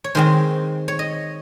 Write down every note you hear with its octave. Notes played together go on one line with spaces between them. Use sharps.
C#5
D#3 G#3 C4 C5
C#5
D#5